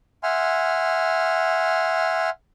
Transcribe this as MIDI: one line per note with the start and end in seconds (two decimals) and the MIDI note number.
0.23 2.30 76
0.23 2.30 78
0.23 2.30 80
0.23 2.30 84
0.23 2.30 89